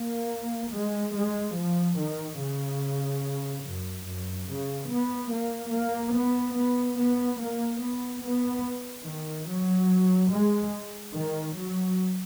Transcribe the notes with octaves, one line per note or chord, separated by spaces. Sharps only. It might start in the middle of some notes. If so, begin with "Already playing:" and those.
Already playing: A#3
G#3
G#3
F3
D#3
C#3
F#2
F#2
C#3
B3
A#3
A#3
B3
B3
B3
A#3
B3
B3
D#3
F#3
G#3
D#3
F#3